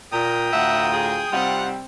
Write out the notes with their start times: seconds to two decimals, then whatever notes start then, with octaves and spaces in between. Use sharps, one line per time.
0.12 A#2 G5 A#5 D#6
0.53 D2 A2 F4 E5 F#5
0.94 G#4
1.32 C3 G3 C4 D#4 F4 F#5